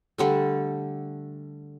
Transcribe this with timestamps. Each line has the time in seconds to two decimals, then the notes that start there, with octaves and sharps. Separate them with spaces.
0.18 D3 G3 A3